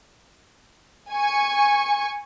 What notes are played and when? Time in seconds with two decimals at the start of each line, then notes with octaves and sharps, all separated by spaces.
1.11 G#5 C#6